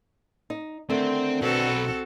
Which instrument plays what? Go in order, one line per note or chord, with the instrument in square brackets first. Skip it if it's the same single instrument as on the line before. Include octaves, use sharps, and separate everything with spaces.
[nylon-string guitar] D#4
[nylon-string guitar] D3 D#3 A3 [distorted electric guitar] C4
[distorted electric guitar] B1 B4 [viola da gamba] C4 F#4 A4